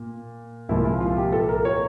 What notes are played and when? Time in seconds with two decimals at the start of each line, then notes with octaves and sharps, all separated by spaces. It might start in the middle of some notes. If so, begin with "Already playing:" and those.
Already playing: A#2
0.69 C2 A#2 F3 G#3 E4
0.85 F4
1.01 F4
1.17 G4
1.32 A4
1.49 A#4
1.65 C#5